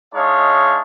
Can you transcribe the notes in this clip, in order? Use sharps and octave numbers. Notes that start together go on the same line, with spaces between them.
G#3 D4 D#4 C#5 E5 F5